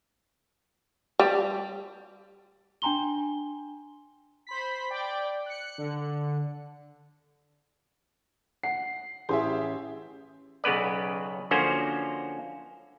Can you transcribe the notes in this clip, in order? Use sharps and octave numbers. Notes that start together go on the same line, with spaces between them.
G3
D4 G5 G#5 A#5 C6 G7
C5 B5 B6
D5 G5
F#6 C#7
D3
F#5 C7
A1 C#4 G4 G#4 E5 C6
B1 C#3 B3 B4 D5
D3 F3 A#3 C#4 F#4 C5